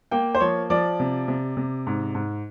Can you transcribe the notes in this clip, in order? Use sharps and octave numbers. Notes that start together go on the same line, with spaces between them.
A#3 G5
C5
F3 C#5
F3 D5
C3
C3
C3
G#2
G#2